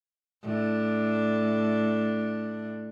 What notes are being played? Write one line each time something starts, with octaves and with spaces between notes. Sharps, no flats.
A2 D4